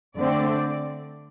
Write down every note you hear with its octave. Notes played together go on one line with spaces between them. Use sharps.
D3 A3 C4 D5